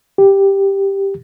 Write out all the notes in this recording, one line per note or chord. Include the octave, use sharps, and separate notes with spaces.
G4